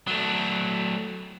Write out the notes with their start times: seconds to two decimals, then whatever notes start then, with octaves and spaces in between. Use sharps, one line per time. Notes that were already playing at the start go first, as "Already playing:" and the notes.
0.07 F#3 A3